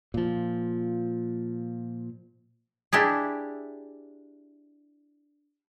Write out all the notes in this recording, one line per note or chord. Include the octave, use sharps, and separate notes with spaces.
A#2 F3
D4 E4 G4 G#4